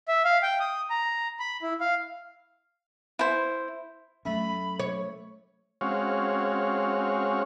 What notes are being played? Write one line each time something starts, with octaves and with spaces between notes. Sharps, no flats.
E5
F5
G5
D#6
A#5
B5
E4
F5
E4 C5
F#3 A3 C#4 B5
C#5
G#3 C4 C#4 F#4 C#5 F5